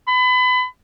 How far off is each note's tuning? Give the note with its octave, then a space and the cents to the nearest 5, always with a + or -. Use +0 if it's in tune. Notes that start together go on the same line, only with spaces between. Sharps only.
B5 +30